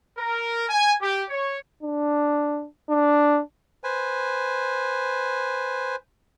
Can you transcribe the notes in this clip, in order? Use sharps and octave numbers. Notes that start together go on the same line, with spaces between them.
A#4
G#5
G4
C#5
D4
D4
B4 C5 G#5